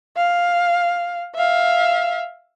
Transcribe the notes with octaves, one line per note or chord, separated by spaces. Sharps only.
F5
E5 F5